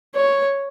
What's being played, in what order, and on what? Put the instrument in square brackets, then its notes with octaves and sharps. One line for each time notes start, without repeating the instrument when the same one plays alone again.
[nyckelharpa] C#5